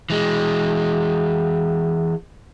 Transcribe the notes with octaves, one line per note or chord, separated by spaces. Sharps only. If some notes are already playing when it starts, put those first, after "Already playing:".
E3 G#3